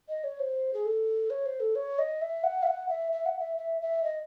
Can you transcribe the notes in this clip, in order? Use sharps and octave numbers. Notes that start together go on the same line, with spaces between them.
D#5
C#5
C5
G#4
A4
C#5
C5
A4
C#5
D#5
E5
F#5
E5
F#5
E5
E5
F#5
E5
E5
E5
D#5